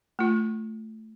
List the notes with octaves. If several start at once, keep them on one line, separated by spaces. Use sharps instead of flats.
A3 F4